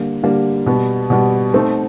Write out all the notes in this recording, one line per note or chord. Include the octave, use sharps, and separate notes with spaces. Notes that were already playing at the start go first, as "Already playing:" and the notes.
Already playing: D3 G3 A#3
D3 G3 A#3
B2 G3 B3
B2 G3 B3
A3 C4 D#4